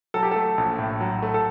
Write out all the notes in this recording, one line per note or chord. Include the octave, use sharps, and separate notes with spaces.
F#3 A4
G4
A3 A4
A#1
A2
F#3
A3
A4